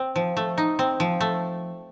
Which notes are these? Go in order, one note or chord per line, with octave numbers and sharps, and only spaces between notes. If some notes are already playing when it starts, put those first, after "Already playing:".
Already playing: C4
F3
A3
D#4
C4
F3
A3